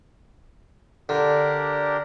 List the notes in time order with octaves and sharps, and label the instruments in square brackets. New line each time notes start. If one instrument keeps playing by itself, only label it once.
[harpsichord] D3 [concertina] D4 G4 A#4